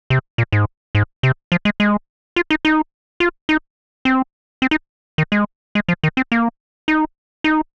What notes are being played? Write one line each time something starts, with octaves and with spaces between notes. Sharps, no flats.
C3
A#2
G#2
G#2
C3
F3
G#3
G#3
F4
D#4
D#4
F4
D#4
C4
C4
D#4
D#3
G#3
G#3
F3
D#3
C4
A#3
D#4
D#4